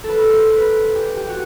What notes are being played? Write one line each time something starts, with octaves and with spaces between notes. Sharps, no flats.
A4
B4
C5
B4
G4
G4
F#4